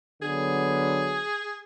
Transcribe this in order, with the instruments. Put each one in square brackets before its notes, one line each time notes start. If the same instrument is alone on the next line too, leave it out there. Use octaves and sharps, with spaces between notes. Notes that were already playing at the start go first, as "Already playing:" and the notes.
[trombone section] D3 F#3 B3 [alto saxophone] G#4